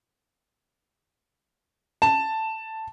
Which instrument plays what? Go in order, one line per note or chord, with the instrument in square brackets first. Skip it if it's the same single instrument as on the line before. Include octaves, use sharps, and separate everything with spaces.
[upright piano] A5